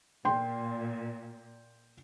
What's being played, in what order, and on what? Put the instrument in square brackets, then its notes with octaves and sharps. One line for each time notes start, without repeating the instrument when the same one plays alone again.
[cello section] A#2 [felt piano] G5 C6